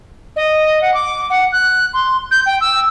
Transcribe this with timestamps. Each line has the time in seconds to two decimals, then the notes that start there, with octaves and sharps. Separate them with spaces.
0.36 D#5
0.82 F#5
0.94 D6
1.30 F#5
1.52 F#6
1.94 C6
2.31 G6
2.46 G5
2.61 E6